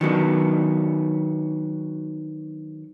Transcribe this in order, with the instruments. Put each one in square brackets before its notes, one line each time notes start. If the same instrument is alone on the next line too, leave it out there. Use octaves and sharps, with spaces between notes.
[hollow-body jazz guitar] D#3 F#3 B3 D4